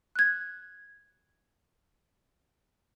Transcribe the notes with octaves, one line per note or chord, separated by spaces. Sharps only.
F#6 G#6